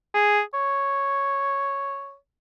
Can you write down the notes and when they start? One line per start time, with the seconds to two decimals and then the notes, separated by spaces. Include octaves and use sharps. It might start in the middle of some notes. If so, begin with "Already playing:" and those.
0.15 G#4
0.54 C#5